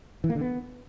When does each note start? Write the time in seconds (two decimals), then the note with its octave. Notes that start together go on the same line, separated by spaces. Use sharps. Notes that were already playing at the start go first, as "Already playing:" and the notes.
0.24 E3
0.30 A#3
0.35 D3
0.41 B3